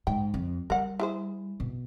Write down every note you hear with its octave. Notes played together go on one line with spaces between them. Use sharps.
G#2 G5
F2
G3 A#4 F#5
E4 G#4 C5
B2